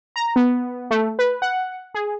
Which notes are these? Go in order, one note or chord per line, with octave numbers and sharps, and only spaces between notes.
A#5
B3
A3
B4
F#5
G#4